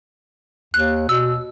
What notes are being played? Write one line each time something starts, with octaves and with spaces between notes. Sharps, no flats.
D#2 F#6
B2 E6